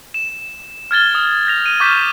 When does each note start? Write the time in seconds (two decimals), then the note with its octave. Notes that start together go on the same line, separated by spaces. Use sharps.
0.14 E7
0.91 F6 G#6 A6 G7
1.14 D#6 F6
1.47 G6 A#6 F7
1.66 D#7
1.80 C#6 D6 F6 G6 B6 E7